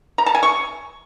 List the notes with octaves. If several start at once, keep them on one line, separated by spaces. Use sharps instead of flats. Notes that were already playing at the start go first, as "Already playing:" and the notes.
A#5
A5
G#5
C#6